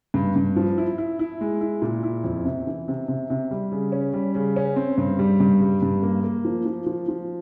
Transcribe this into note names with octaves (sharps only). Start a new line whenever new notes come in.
G2
G2
F3
E4
E4
E4
G#3
E4
A#2
E4
F2
C3
E3
C3
C3
C3
G3
C#3
C#4
G3
C#3
C#4
C4
G2
G3
G2
G3
G2
A#3
A#3
F3
F3
F3
F3